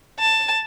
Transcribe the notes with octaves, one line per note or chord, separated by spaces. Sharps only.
A5